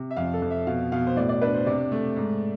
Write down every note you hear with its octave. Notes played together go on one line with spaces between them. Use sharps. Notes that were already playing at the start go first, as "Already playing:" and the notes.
Already playing: C3
E5
F2 F5
A4
F2
E5
B2 F5
B2 F5
C5
A2 D5
D5
D4 B4
C5
C3 D5
A3
G#2